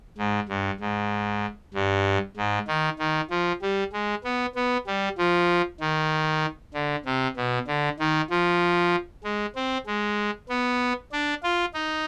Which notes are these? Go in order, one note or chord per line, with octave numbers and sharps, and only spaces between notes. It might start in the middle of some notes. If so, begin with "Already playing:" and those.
G#2
G2
G#2
G2
G#2
D#3
D#3
F3
G3
G#3
B3
B3
G3
F3
D#3
D3
C3
B2
D3
D#3
F3
G#3
C4
G#3
B3
D4
F4
D#4